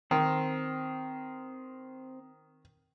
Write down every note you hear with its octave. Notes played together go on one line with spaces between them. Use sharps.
D#3 C4 C5